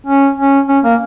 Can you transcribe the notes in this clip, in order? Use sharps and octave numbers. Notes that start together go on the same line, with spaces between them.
C#4
C#4
C#4
A#3